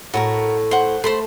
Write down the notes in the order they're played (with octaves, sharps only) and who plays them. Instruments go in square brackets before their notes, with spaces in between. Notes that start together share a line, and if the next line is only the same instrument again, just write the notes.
[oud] A2 [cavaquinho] F#4 A4 A#4
[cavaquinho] C5 F#5
[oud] A3 [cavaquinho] C5 B5 C6